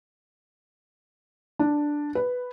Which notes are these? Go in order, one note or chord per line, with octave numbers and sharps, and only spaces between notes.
D4
B4